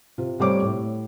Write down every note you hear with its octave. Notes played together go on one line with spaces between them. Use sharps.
C3 F4
C3 G3 A3 C5 C#5 D6
A2